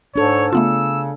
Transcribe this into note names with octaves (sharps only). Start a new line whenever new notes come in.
G#2 D4 A4 C#5
C#3 A3 B3 F4 E6